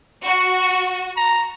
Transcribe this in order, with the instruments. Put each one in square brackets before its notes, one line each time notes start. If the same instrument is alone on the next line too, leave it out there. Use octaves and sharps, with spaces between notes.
[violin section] F#4
[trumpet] A#5